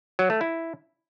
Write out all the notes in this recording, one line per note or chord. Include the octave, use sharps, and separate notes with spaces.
F#3
A3
E4